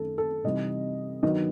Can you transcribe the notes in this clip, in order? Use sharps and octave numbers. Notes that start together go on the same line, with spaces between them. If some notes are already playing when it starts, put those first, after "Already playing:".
Already playing: F#2 D#3 A3 A4
A4
C3 E3 G3 D#4 D#5
G2 D#3 F#3 B3 D#4 D#5